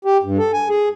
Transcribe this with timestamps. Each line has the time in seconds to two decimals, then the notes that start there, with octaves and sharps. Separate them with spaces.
0.05 G4
0.23 G2
0.38 A4
0.53 G#5
0.69 G#4